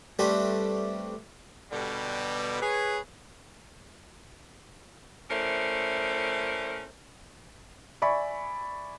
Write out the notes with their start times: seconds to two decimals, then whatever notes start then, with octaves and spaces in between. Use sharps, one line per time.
0.19 G3 A3 C4 D4 G4 B4
1.72 B2 D3 G3
2.62 G#4 B4 C#5
5.29 A3 C#4 E4 A#4 C5 D5
8.02 D5 E5 G#5 B5 C#6